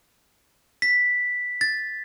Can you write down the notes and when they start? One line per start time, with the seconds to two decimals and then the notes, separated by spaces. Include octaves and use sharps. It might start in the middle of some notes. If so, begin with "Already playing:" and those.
0.82 B6
1.61 A6